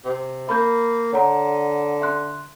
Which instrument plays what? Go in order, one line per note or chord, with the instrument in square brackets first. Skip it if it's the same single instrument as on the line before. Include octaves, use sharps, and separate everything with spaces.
[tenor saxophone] C3
[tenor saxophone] A#3 [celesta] B5 G6
[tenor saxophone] D3 [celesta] C#5 F#5 A#5
[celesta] E5 C6 F#6